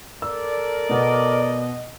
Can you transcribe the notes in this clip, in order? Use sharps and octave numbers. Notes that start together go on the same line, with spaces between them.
A4 A#4 D5 E6
B2 B3 D#5